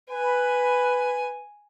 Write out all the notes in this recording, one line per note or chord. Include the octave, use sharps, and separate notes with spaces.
B4 G#5